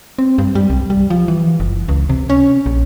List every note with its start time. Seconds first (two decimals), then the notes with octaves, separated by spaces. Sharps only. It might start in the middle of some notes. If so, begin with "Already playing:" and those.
0.19 C4
0.38 G2
0.55 G3
0.70 C2
0.90 G3
1.10 F3
1.28 E3
1.60 F#1
1.88 C#2
2.09 C3
2.30 C#4
2.66 A#1